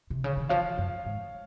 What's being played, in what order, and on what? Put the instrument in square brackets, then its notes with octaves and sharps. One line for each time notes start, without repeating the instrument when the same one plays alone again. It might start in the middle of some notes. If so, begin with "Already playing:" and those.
[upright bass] C3
C#3
D#3
[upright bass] F3 [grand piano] C#5 F5
[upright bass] F#2
G#2